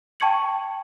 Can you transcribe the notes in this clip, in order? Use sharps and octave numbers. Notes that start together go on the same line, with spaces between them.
G5 A5 C#6 G#6 C#7 F#7